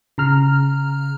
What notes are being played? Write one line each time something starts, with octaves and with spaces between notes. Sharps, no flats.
C#3 A#5 F6